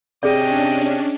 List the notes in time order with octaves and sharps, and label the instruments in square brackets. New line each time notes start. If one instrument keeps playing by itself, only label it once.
[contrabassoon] C3 [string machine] C#4 D4 [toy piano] G#4 D5 [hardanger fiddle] D#5 G5